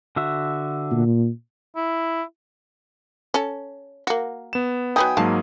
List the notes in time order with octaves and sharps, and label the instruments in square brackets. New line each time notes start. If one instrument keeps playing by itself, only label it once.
[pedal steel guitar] D3 F#4 E5
[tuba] A#2
[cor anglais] E4
[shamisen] C#4 A4
A#3 F#4
[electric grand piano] B3 E7
[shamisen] F#3 B3 D#4 [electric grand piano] G5 G#5 D#6
[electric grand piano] G#2 F#3 A#3 [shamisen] F5 A5